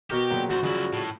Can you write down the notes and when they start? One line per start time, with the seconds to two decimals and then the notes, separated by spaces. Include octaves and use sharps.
0.10 B2 G4 A#4 C#6
0.31 A#2 C#3 F#3
0.50 F#2 F#4 C5
0.63 F#2 C#3 F3 G3 E4
0.93 A2